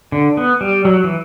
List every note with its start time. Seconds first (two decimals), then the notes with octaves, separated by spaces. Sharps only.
0.12 D3
0.37 B3
0.61 G3
0.85 F#3
1.04 E3